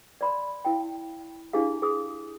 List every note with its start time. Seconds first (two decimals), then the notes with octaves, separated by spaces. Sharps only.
0.21 D5 B5 C6
0.65 E4 F5 G5
1.53 D4 E4 G4 G#4 F5
1.82 G#4 D#6